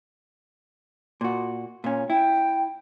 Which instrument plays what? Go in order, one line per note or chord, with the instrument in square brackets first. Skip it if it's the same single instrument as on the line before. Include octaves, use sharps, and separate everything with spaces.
[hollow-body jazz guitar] A#2 F#4
A#2 C#4
[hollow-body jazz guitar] E4 [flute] G5